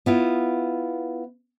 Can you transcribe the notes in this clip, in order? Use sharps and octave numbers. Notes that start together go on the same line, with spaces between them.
B3 E4 F4